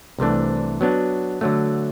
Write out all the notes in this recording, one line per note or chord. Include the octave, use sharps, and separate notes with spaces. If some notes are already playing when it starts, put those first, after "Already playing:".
C2 C3 E3 A3 D4
F#3 B3 D4
D3 F#3 A3